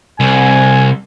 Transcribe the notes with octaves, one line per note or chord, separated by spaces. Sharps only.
C2 G#5